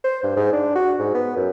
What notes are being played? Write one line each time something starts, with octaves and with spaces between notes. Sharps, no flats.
C5
G2
G#2
D4
F#4
G#2
B3
F#2